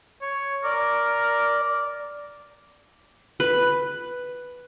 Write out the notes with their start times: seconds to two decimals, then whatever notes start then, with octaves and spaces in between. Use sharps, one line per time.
0.22 C#5
0.64 A#4 D5
3.40 B4